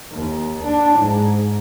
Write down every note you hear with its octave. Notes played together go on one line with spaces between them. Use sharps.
D#2
D4
G#2